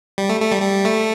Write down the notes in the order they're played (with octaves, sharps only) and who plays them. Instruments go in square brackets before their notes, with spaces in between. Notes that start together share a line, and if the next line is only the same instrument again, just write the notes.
[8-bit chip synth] G3
A3
A3
G3
G3
A3